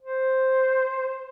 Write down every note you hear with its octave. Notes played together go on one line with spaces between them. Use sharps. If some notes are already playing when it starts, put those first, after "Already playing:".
C5